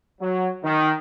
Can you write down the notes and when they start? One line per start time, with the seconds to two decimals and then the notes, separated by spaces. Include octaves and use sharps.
0.21 F#3
0.64 D#3